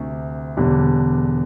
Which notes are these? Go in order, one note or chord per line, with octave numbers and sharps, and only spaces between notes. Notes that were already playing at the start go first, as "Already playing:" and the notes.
Already playing: D2 C3
E1 E2 D3 G3 D4